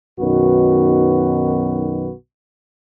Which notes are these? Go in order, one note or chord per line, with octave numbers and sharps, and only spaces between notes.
B1 F#2 B2 D#3 F#4 B4